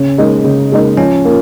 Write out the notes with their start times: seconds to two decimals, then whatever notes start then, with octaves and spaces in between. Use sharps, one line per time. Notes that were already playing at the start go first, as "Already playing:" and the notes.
Already playing: C#3 C#4
0.18 G#3 D#4 A#4
0.44 C#3
0.72 G#3 D#4 A#4
0.98 F3 C#4
1.25 A#3 F4